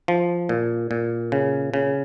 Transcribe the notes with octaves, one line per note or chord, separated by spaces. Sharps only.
F3
A#2
A#2
C#3
C#3